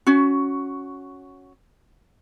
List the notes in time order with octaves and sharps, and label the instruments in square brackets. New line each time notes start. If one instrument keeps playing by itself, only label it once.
[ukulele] C#4 F#4